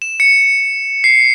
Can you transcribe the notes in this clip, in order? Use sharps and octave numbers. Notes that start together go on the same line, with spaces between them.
E7
C#7
C7